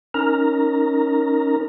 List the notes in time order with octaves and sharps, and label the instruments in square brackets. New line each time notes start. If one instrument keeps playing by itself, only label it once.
[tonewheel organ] C#4 D#4 A#4 A#5